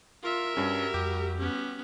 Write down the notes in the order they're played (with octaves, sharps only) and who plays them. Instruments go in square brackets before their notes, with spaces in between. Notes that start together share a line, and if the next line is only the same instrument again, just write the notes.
[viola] F4 [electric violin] A#4 E5
[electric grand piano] G2 C#4 [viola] G3 F#4
[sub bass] F2 [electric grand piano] G4
[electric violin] B3 C#4